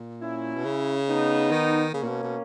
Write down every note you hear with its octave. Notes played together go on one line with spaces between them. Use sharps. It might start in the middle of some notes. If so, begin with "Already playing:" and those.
Already playing: A#2
C#4 E4
B2
C#3
B3 D#4
D#3
C#3 A#3 C#4
A#2
B2
B2